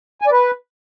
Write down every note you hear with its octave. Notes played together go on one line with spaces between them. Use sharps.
G#5
D5
B4